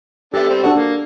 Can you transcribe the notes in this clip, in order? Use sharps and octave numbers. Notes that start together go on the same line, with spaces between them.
B3 D4 G4 A4 E5
G3 C4
D4 F#4 A4 D5
A#3 D4